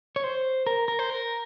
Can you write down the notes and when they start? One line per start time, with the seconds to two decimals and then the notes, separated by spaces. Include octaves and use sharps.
0.16 C#5
0.24 C5
0.67 A#4
0.88 A#4
0.99 C5
1.10 A#4